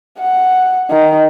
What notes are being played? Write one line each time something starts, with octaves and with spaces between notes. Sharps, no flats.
F#5
D#3